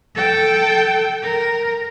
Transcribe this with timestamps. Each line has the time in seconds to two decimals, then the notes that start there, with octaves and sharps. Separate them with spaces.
0.15 A4 G5
1.22 A#4